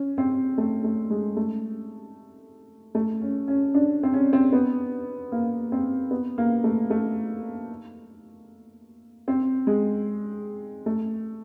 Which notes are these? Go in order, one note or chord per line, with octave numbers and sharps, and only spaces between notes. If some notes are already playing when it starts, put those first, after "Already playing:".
Already playing: C#4
C4
A3
A3
G#3
A3
A3
C#4
C#4
D4
C4
C#4
C4
B3
A#3
C4
B3
A#3
A3
A3
C4
G#3
A3